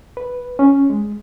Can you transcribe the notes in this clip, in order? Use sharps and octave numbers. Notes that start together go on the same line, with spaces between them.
B4
C#4
G#3